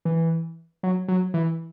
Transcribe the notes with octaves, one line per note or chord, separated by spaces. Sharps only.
E3
F#3
F#3
E3